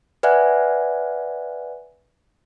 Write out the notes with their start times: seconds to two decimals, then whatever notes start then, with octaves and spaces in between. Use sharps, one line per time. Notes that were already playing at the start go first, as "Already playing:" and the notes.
0.23 B4 D5 E5 F#5 G#5 F#6